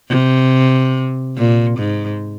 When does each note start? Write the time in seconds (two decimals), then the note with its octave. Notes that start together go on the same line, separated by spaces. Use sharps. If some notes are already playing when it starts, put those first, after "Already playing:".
0.09 C3
1.37 A#2
1.79 G#2